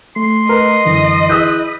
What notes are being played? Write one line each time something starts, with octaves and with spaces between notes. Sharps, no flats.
A3 C6
A#4 B4 D#5
F#2 D3 E3
E4 G#4 B4 D#6 E6 G6